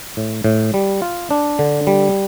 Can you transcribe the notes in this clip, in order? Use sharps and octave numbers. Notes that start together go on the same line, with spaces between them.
A2
A2
G3
F4
D4
D3
G3